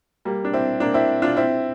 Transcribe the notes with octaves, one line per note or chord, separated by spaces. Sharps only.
G3 A#3
D4
C4 E4
A#3 D4
C4 E4
D4 F4
C4 E4